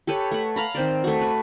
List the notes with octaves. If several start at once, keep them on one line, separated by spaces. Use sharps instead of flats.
G4 A4 B4 C#5
A3 F#5
F5 A#5 B5
D#3 C4 C5 D5
A3 F#4
B4